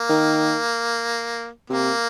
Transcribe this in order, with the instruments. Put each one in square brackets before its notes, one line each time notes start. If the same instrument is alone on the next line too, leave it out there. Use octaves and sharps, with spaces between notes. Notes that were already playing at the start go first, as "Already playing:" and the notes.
Already playing: [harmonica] A#3
[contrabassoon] D#3
[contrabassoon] C3 [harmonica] A#3